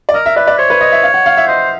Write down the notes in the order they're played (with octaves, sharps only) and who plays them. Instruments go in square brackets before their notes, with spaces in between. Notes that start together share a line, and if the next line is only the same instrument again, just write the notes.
[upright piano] D5
[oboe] A#4 [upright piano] D#5
[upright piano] E5
[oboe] B4 [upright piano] D5
[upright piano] D5
[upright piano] C5 [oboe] C#5
[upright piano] B4
D#5
E5
F5
F#5
F5
E5
[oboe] C5 [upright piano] D#5